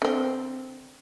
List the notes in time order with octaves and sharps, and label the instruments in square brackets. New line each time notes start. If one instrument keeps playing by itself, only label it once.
[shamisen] D3 C4